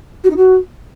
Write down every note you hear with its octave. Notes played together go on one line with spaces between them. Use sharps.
F#4
D#4
F#4